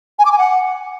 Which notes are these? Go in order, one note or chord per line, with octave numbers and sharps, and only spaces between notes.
G#5
D6
G#5
F#5